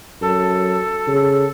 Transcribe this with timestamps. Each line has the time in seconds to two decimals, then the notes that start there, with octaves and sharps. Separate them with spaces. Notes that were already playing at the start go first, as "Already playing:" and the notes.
0.22 F#2 A4
1.08 C#3